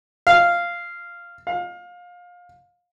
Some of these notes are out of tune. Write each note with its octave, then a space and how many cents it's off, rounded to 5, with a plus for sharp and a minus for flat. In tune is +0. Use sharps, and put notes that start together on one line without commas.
F5 -10
F5 +25